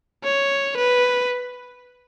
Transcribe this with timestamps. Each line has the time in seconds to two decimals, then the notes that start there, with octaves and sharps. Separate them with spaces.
0.24 C#5
0.77 B4